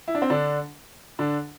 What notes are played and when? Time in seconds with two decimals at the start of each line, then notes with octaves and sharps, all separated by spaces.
0.08 E4
0.15 D4
0.22 C4
0.30 D3 D4
1.19 D3 D4